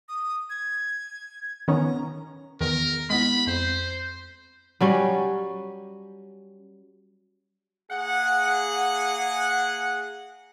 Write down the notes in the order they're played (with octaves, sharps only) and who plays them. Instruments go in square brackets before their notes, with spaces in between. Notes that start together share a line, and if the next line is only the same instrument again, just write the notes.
[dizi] D#6
G#6
[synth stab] D#3 B3 C#4 [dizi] A#5
[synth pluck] E2 D#3 E3 [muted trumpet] A#4
[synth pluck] G#3 B3 E4 [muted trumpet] B5
[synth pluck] F2 [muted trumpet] C5
[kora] F#3 G3 C#4
[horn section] A#3 G#4 F#5